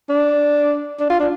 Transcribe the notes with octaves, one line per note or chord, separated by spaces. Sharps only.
D4
D4
F4
D4